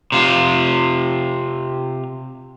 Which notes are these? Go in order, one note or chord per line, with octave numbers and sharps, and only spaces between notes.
C3 F4